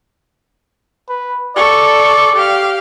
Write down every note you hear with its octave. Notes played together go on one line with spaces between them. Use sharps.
B4
A4 D5 C#6
G4 F5